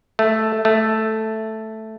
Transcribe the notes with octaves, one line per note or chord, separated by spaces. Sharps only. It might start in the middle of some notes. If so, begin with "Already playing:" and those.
A3
A3